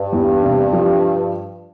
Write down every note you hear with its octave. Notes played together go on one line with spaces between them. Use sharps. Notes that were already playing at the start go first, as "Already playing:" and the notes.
Already playing: G2
E2
C3
F3